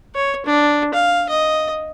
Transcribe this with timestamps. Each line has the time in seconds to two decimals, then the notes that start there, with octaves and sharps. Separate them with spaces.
0.15 C#5
0.46 D4
0.94 F5
1.30 D#5